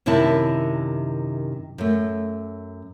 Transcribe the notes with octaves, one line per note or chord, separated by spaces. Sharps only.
F#2 C3 D#3 E4 A5
F#2 A3